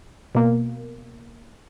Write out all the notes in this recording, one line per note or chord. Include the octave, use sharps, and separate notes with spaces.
B2 A#3